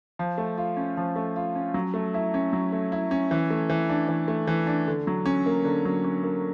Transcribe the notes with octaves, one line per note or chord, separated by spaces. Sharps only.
F3
A3
F4
C#4
F3
A3
F4
C#4
F#3
A3
E4
C#4
F#3
A3
E4
C#4
E3
A3
E3
D4
E3
A3
E3
D4
D3
F#3
C#4
A#3
D3
F#3
C#4
A#3